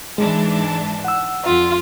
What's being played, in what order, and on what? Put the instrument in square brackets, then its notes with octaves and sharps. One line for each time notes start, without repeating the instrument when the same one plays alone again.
[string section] G#2 E3 D4 [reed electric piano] G#3
[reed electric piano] F#5 E6
[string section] F2 [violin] F4